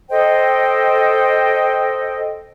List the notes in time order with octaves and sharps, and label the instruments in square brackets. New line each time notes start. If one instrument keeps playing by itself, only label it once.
[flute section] A4 C5 D#5 G5